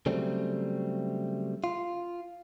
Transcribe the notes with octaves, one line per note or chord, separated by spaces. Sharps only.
C#3 F#3 G3 A3 C4
F4